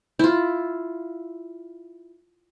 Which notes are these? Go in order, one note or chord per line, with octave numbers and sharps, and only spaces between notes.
E4 F4